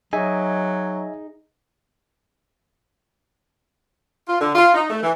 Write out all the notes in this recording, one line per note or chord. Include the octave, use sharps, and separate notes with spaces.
F#3 D#4 G#4 D#5 E5 G#5
F4
D3
F4
D#4
A3
E3